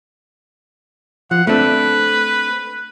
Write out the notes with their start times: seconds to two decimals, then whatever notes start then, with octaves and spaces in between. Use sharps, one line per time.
1.31 F3 F#5
1.47 A3 C4 D4 B4